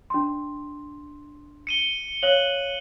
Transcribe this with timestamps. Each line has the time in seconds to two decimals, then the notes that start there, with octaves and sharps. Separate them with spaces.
0.10 D4 C6
1.67 C#7 D#7 G7
2.23 C#5 F5 F#6 F#7